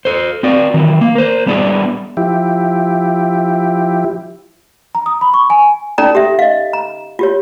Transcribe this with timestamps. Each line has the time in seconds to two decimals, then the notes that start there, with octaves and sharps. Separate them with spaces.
0.05 A4 C5
0.43 C4 F#4 D5
0.74 D#3 E3 F#3
1.01 A#3
1.15 A#4 C5
1.46 G3 B3 D4 E4 G#4
2.17 F3 E4 G4
4.95 A#5
5.06 D#6
5.21 B5
5.34 C#6
5.50 G#5
5.98 C#4 D#4 A4 D5 G5 A#5
6.15 G4 A4 E5
6.39 D#5 F5
6.73 A#5
7.19 F4 G4 C#5